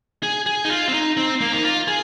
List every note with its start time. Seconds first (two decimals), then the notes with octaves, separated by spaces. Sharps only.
0.23 G#4
0.46 G#4
0.65 D#4
0.70 F4
0.88 C4
0.94 D#4
1.17 C4
1.41 A#3
1.52 D#4
1.64 F4
1.88 G#4